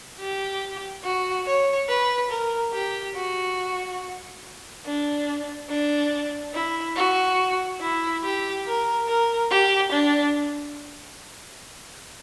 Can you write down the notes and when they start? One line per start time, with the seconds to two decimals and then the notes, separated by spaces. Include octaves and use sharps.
0.19 G4
1.03 F#4
1.46 C#5
1.89 B4
2.30 A#4
2.73 G4
3.15 F#4
4.85 D4
5.69 D4
6.53 E4
6.96 F#4
7.80 E4
8.24 G4
8.66 A#4
9.08 A#4
9.50 G4
9.92 D4